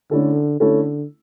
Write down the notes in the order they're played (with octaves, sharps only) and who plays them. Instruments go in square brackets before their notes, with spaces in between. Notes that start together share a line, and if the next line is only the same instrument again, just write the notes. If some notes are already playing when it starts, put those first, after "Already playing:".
[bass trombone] D3 [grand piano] A3 C#4 E4 A4
[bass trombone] D3 [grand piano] A3 C#4 E4 A4